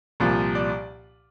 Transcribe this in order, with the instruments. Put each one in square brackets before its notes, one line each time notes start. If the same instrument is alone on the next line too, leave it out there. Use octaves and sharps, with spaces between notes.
[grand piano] C2 A#2 F3
D5